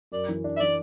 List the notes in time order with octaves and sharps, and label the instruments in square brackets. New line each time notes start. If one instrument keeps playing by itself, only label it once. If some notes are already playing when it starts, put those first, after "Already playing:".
[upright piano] F#2 [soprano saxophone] D5
[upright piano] E3
D4
[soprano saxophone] E5
[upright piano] E3 [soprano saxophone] D5